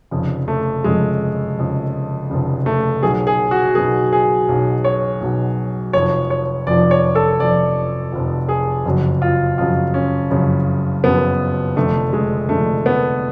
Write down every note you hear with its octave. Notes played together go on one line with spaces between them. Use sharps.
F1 F2 C#3
A3
F1 F2 C#3 G#3
F1 F2 C#3
F1 F2 C#3
A3
B1 B2 F#3 G#4
G#4
F#4
B1 B2 F#3 G#4
G#4
B1 B2 F#3
C#5
B1 B2 F#3
F1 F2 F3 C#5
C#5
F1 F2 F3 D5
C#5
A4
F1 F2 F3 D5
F1 F2 F3
G#4
F#1 F2 C#3 F#3
F4
F#1 F2 C#3 F#3 F4
C#4
F#1 F2 C#3 F#3
F#1 F2 C#3 F#3 B3
F1 F2 D3 A3
G#3
F1 F2 D3 A3
B3